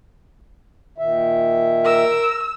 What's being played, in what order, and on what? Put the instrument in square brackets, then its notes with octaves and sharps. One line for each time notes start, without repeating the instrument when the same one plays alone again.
[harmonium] A#2 D#3 E5
[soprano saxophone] A#4 [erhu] E6